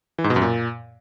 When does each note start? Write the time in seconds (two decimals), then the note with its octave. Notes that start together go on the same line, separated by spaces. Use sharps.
0.18 E3
0.24 G#2
0.30 B2
0.36 F#2
0.42 A#2